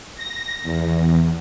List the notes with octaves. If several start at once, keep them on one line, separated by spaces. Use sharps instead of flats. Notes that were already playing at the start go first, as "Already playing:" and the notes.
A#6
E2